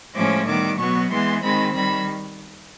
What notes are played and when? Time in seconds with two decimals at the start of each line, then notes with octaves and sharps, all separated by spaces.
0.15 A2 F3 G#3 C#4 D6
0.46 D#3 G3 B3 D6
0.79 B2 F#3 B3 C#6
1.11 E3 G#3 B3 C6
1.43 D#3 G#3 C4 B5
1.75 D#3 G3 B5